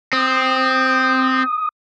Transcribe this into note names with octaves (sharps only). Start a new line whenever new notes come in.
C4 D#6